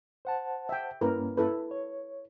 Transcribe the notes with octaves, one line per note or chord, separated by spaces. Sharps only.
C5 F#5 A5
E5 G5
G2 A#3 C#4 E4 A#4 B4
E4 A4 B4
C#5